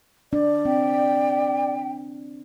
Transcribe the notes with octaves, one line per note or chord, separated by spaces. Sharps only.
D4 D5
C4 G5